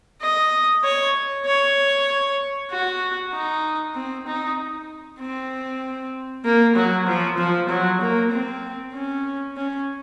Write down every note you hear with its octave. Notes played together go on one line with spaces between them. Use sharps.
D#5
C#5
C#5
F#4
D#4
C4
D#4
C4
A#3
F#3
F3
F3
F#3
A#3
C4
C#4
C#4